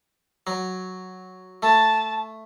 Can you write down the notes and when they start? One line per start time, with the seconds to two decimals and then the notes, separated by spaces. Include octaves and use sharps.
0.47 F#3
1.63 A3 A5